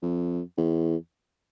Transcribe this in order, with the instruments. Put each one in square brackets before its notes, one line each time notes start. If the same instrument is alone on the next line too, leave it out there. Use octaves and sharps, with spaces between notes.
[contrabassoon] F2
E2